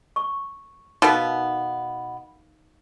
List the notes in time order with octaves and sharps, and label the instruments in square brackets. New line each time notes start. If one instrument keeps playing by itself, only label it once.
[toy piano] C#6
[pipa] B2 B3 [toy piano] D#4 A#4 F5